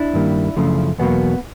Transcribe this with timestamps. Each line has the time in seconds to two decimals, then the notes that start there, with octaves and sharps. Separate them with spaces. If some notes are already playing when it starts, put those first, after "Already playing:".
Already playing: D4 E4
0.14 G2 D#3 G3 A#3
0.57 F#2 C#3 F3 A3
0.98 E2 B2 F#3 A#3 B3